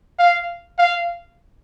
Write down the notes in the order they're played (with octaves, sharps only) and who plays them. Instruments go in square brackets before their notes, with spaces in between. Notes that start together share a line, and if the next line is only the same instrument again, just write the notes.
[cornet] F5
F5